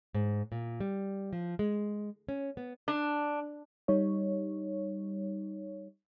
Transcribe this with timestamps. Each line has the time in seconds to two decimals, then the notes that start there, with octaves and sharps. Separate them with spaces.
0.14 G#2
0.52 A#2
0.80 G3
1.33 F3
1.59 G#3
2.29 C#4
2.57 B3
2.88 D4
3.88 G3 D#4 C#5